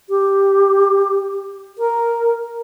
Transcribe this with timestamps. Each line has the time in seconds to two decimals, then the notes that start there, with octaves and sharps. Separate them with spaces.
0.09 G4
1.78 A#4